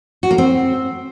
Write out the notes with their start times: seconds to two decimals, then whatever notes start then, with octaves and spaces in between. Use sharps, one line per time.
0.23 F#4
0.31 A#3
0.38 C4